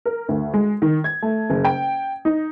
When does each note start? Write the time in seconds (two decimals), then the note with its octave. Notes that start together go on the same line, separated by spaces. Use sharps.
0.05 A#4
0.28 D2
0.54 G#3
0.82 D#3
1.04 G#6
1.22 A3
1.50 F#1
1.65 G5
2.25 D#4